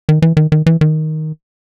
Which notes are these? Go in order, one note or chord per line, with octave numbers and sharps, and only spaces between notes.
D#3
E3
D#3
D#3
E3
D#3